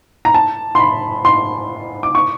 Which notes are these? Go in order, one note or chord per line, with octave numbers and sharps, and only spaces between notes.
A#5
A5
C6
B5
C6
D6
C#6